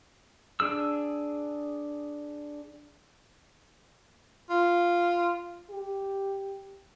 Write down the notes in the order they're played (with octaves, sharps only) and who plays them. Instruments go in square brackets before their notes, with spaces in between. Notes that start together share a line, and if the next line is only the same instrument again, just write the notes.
[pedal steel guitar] D4 G#4 E6
[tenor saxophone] F4
[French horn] G4